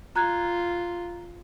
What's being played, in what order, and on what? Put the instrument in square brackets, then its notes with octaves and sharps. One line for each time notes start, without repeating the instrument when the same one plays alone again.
[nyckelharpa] F4 [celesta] A#5 F#6 G#6